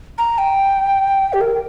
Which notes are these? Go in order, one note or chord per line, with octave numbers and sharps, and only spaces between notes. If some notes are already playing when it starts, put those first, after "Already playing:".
A#5
G5
G4
A#4